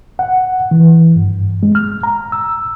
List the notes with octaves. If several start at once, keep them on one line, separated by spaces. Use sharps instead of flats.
F#5
E3
G2
G#3
F6
A#5
E6